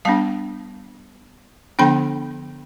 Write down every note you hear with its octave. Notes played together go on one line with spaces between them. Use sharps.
G3 B3 D4 F5 A5
D3 F3 B3 D4 G5 B5